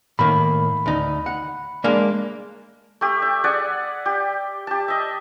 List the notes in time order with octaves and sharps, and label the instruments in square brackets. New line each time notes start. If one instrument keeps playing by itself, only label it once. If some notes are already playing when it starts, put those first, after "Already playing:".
[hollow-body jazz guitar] A2 D#3 A#3 [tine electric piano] B5
[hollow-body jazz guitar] D2 D#4
F#5
G#3 A#3 D4
[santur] A3 G4
E5
G#4 D5 F#5
G4
G4 A5
D#5 E5